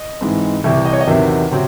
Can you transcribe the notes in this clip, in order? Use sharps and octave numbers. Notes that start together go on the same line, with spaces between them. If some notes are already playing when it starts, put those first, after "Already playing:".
Already playing: D#5
G#2 E3 G#3 C4
C2 C3 E3 E5
D#5
C#5
D#5
E2 C3 D#3 F#3 E5
C3 F#3 C4